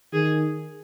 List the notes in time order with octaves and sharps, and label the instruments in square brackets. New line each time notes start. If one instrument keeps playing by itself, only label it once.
[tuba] D#3 [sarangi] G#4